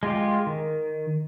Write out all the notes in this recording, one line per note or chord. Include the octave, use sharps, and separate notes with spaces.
G#3 F4 G4
D#3